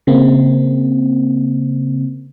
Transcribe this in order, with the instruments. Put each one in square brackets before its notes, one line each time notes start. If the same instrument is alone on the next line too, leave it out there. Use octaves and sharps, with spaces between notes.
[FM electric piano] C#3 A#3 C4